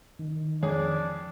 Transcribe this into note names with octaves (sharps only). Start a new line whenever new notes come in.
D#3
F2 D4 G#4 C#5